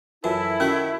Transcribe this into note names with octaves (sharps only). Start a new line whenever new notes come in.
F#2 E3 E4 F4 A4
D#3 C#4 F#4 F#5